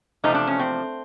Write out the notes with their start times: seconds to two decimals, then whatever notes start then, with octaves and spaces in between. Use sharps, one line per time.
0.24 E2 C3 F3 A3 C4 D#4
0.34 D4
0.47 C#4
0.59 C4